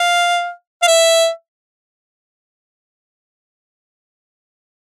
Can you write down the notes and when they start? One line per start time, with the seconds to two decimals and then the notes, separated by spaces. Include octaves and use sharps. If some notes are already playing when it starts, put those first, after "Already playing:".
Already playing: F5
0.82 F5
0.87 E5